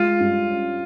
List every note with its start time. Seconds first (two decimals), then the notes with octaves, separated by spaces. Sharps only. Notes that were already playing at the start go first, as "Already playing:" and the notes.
Already playing: G#3 F4
0.20 G2
0.49 C#4